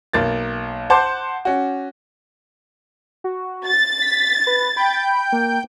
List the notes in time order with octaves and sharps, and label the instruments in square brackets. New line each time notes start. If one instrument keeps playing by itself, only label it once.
[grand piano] B1 A#3 A6
C5 F#5 A5 C6 D6 G6
C#4 F#4
[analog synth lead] F#4
[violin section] A6
[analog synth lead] B6
B4
[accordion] G5 G6 [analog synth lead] B5
[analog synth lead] A#3